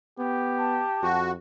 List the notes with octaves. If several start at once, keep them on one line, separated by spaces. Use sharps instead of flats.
B3 G4
A5
F2 F#4